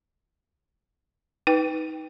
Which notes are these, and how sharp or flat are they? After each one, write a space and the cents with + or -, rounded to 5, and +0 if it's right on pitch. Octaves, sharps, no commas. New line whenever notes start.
D#4 +25 B4 +0 G5 +0